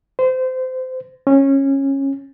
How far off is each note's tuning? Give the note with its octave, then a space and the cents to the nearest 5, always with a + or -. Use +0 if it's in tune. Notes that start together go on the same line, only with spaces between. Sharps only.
C5 -25
C#4 -20